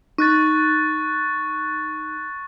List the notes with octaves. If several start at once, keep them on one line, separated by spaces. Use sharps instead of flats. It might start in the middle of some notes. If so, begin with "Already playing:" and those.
D#4 C#6 F#6 A6